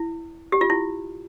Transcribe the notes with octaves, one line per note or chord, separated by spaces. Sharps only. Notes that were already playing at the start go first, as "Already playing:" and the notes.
Already playing: E4
G4
F4
E4